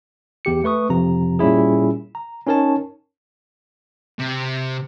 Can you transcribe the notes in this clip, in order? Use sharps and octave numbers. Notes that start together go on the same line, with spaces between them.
E2 G4 C#7
A3 B4 C#6 D#6
F2 C3 F3 A#5
A#2 G3 C#4 E4 G#4
A#5
C#4 D#4 A#4 C#5 A5
C3